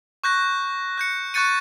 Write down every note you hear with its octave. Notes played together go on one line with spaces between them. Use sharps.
C#6 F#6 G6 A#6
F#6 G6 C#7
C#6 F#6 G6 A6 C#7 D#7